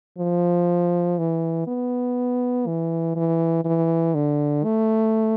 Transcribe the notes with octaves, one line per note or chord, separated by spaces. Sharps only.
F3
E3
B3
E3
E3
E3
D3
A3